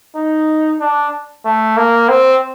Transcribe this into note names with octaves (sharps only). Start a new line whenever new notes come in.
D#4
D4
A3
A#3
C4